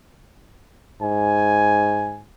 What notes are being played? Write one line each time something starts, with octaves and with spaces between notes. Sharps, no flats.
G#2 G#5